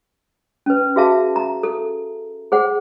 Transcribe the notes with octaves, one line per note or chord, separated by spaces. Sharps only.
C#4 B4
F#4 G#4 E5 F5 A5
A#5
A4
G#4 C5 F#5